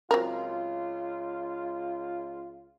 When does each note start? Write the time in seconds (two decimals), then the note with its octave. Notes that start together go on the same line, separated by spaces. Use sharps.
0.11 C#2 F#3 C4 F4 A#4